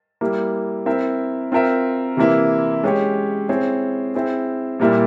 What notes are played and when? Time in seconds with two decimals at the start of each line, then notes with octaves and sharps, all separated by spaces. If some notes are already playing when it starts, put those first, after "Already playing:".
0.21 G3 A#3 E4
0.86 C4 E4 A#4 E5
1.52 C4 F4 A#4 E5
2.17 C3 E3 A#3 E4
2.83 G#3 C#4 G4 C#5
3.49 C4 E4 G#4 C#5
4.15 C4 E4 G#4
4.79 A#2 G3 A#3 E4